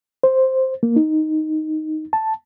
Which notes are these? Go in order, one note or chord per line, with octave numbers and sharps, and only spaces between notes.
C5
A#3
D#4
A5